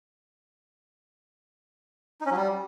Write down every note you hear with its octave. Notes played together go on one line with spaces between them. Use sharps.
D#4
C#4
F#3
G3